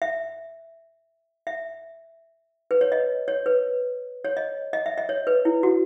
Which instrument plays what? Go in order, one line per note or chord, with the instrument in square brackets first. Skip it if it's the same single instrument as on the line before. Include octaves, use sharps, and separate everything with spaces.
[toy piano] E5
E5
B4
C#5
D#5
C#5
B4
C#5
D#5
D#5
E5
D#5
C#5
B4
E4
F#4